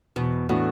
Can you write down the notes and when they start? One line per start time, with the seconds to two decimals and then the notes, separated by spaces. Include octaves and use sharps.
0.16 E2 B2
0.49 A2 E3 B3 D4 F#4